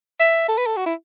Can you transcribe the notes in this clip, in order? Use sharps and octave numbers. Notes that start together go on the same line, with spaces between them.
E5
A4
B4
A4
F#4
E4